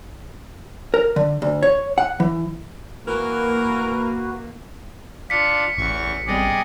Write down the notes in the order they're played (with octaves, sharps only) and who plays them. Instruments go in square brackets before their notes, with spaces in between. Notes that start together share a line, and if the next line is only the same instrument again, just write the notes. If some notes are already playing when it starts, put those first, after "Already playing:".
[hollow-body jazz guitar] A#4
D3
D2
C#5
F#5
E3
[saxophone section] E3 A#4 [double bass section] A#3 [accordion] F#4 B4
[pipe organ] D4 F4 [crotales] B6 C#7
[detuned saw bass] A1 [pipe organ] E2 C#6
[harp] C3 G3 B3 [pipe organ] G#4 D5 D#5